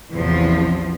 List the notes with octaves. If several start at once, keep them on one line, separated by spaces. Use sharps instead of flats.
A1 E2 C3 F3